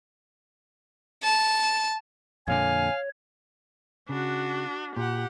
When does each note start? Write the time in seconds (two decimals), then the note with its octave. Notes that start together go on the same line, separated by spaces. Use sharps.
1.23 A5
2.48 F2 A#2 D3 C#5 F5 G#5
4.09 C#3 D4 F#4
4.97 A#2 G4 F#5